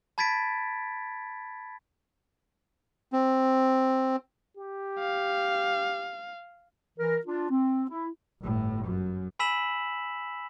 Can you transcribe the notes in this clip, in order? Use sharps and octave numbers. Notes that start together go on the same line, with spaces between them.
A5 B5 G#6 A6 B6 D7
C4
G4
F5
E3 A#4
D4 F4
C4
E4
G1 A2
F#2
G#5 B5 E6 B6 E7 F#7